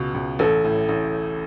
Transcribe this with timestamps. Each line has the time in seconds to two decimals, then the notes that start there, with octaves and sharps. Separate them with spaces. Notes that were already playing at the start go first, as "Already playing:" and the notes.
Already playing: C#2 B2
0.14 C#2
0.39 A1 A4
0.64 A2
0.89 A1